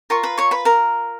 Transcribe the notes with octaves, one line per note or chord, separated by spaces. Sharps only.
F4 A#4 C#5 C#6
B4 B5
C#5 C#6
B4 B5
A#4 A#5